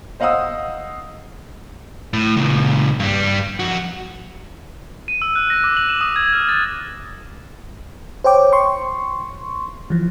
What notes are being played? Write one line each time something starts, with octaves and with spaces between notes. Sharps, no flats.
C5 D#5 F5 F#5 D#6 E6
A2
C#2 A#2
G2 G3
F2 F#4
D#7
E6
F#6
A#6
D6
F#7
E7
D#6
G#6
F6
A6
C5 C#5 G5 D6
C6 C#6
E3 F3